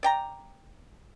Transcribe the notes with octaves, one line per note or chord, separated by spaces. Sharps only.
D5 G5 A#5